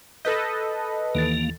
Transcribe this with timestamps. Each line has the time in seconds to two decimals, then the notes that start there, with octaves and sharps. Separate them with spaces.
0.25 A4 B4 D#5 G6
1.15 D#2 E3 A#3 A6